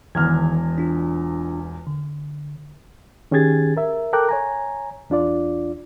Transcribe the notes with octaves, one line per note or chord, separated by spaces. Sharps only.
E1 E2 D#3 F6 G#6
D4 F4
D3
D#3 C#4 G4 G#4 G#6 A6
A#4 E5
A4 A#4 G5 D6 F#6
C#5 G#5 A#5
E2 D4 F4 D5